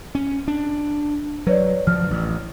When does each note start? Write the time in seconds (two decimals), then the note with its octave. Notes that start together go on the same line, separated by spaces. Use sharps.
0.15 C#4
0.48 D4
1.47 F#3 B4 C#5 D5
1.87 D2 F3 F6
2.10 A1